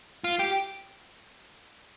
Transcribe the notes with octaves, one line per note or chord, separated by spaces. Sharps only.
F4
G4